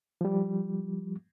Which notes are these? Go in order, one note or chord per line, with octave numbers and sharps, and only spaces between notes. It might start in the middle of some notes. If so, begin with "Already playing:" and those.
F3 G3